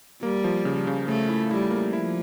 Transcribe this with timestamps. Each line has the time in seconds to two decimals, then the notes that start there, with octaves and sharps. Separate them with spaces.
0.22 G3 A#3
0.44 F3
0.65 C#3
0.87 C#3
1.08 C#3 A3
1.29 E4
1.51 G3 E4
1.71 A#3
1.93 F3 E4